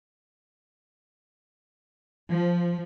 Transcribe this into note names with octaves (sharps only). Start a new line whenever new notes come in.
F3